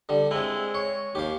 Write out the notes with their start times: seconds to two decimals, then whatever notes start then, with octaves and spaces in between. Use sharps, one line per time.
0.09 D3 G3
0.31 G#3 C4 E4
0.75 C#5
1.15 D#2 G4 F5